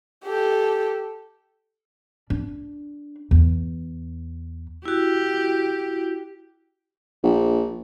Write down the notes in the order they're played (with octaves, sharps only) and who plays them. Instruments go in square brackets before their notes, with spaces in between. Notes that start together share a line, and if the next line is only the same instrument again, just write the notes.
[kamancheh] G4 A4
[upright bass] D4
E2
[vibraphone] E4 F#4 [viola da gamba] G4
[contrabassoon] A#1